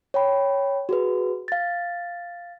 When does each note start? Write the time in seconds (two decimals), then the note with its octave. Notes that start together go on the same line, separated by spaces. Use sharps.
0.14 C#5 G5 B5
0.89 F#4 G#4 B4
1.48 F5 A6